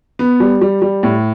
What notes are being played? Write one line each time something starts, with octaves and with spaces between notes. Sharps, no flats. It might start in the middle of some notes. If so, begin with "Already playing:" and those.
B3
G3
G3
G3
A2